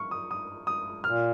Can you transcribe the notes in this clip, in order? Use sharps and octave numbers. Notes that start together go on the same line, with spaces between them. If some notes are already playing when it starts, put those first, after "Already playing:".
Already playing: C#6 F6
D#6
D#6
D#6
A#2 F6